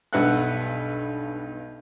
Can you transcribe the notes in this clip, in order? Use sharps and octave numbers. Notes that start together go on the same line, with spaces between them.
B1 G2 B4 E5 F#5 F#6